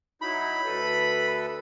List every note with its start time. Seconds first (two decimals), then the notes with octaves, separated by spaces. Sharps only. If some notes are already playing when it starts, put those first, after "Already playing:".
0.22 F#3 D#4 E4 B5
0.65 D2 A4 B4